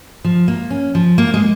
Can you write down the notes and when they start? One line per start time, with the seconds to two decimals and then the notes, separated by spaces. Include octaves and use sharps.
0.24 F3
0.48 A#3
0.70 C#4
0.95 F3
1.18 A#3
1.34 G#3